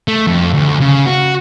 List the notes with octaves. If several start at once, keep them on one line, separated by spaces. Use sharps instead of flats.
A3
F2
D2
C#3
F#4